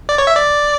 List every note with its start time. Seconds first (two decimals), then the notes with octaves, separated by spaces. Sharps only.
0.09 D5
0.18 C#5
0.27 E5
0.37 D5